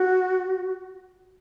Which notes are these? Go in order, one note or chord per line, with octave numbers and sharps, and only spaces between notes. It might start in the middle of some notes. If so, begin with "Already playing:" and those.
Already playing: F#4